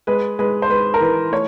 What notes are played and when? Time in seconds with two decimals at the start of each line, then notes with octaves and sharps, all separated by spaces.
0.07 G#3 B4
0.39 G#3 B4
0.62 C5
0.69 G#3 B4
0.94 A#4
1.00 E3 B4
1.32 A3 C#5